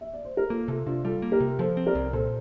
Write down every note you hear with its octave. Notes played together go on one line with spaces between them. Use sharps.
E5
D5
C5
A#4
A#3 F4 A4
C3 F4 A4
C3 D4 F4
G3 F4 A4
A#3
G4 A#4
C3
F3 A4 C5
C4
A#4 D5
C2
A#2 A4 C5